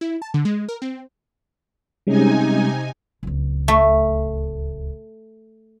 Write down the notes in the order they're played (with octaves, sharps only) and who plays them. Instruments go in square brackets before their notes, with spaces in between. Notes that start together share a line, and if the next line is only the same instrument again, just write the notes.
[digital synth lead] E4
A5
D3
G#3
A#4
C4
[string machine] C3 D#4 G#5 [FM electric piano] G3 G#3 C#4
[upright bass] D1 C#2
[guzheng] A3